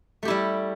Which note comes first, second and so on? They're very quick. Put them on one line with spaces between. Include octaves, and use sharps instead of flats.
A3 G4 E4 G3